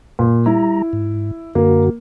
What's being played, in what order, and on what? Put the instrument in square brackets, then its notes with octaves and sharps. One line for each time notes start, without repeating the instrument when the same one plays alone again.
[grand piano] A#2
[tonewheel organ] G3 A#5 [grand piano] E4
[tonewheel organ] G#2
[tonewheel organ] F#2 D3 F#4 [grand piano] A#3